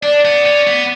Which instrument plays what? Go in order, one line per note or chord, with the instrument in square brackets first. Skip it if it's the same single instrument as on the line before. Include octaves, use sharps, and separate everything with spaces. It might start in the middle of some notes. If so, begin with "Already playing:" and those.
[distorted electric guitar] D4 [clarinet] D5
[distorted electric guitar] B3
C#4
B3